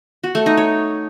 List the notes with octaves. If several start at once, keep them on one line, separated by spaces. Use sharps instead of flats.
F#4
A3
D#4
C#5